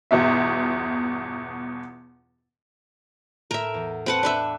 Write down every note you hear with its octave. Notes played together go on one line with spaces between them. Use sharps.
G1 E2 B2 E5
A2 A#4 E5
E2
C4 B4 F#5 G5 A5
D4 B4 E5